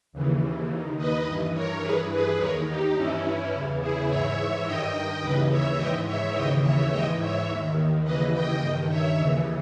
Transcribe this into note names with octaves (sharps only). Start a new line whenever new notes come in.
D#2 C#3 E3
D#2 D#3
B4 D#5
G2 E3
A#4 C#5
G2 E3 G#4 B4
G#4 B4
D#2 D#3 A#4 C#5
D#4 G4
G2 E3 C#4 E4
E2 C#3 E3
E4 G#4
G#2 E3 C#5 E5
G2 D#3 D#5 G5
D#2 C#3 E3 B4 D#5
C#5 E5
G#2 E3 D#5 G5
C#5 E5
D#2 C#3 E3 D#5 G5
C#5 E5
G#2 E3 D#5 G5
C#5 E5
D#2 D#3
D#2 C#3 E3 B4 D#5
D#5 G5
G2 D#3
C#5 E5
D#2 C#3 E3